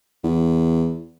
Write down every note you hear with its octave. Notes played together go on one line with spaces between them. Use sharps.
E2